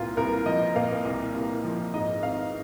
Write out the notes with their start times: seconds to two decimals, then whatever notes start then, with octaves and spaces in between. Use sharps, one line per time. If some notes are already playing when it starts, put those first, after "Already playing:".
Already playing: C2 A#2 F4
0.17 C2 A#4
0.46 F3 D#5
0.76 A#2 F5
1.05 C2
1.34 C2
1.65 F3
1.94 G#2 D#5
2.23 G#1 F5